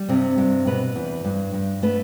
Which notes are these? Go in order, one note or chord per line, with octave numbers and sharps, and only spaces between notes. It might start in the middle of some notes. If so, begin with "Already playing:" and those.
Already playing: G3
G2 C3 C4
G2
B2 B3 B4
E2
G2
G2
A3 B3 B4